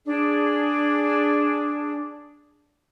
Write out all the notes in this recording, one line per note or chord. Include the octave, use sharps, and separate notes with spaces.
D4 G#4